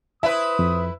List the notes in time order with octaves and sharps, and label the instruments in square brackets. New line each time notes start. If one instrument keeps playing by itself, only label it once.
[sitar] E4 B4 [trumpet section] C5 D#6 [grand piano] E5
[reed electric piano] F2